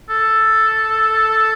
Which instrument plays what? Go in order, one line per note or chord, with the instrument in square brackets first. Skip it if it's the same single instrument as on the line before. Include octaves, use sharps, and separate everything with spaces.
[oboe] A4